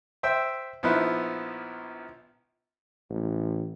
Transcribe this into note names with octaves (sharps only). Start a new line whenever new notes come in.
C5 E5 G5 E6
A#1 F3 B3 D#4 E4 F#6
A1